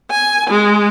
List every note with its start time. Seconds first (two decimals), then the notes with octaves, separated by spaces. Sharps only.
0.11 G#5
0.50 G#3